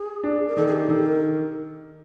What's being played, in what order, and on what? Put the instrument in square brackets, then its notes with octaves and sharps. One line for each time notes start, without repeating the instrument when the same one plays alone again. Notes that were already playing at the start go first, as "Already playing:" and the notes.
Already playing: [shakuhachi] G#4
[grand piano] D4
[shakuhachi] A#4
[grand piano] D#3 [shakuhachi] A4
[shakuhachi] G#4
G4
[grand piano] D#3 [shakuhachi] A4
[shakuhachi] A#4